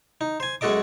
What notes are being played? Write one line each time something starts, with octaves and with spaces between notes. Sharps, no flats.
D#4
C5 G#5
F#2 G#3 F#4 A4 D#5 D6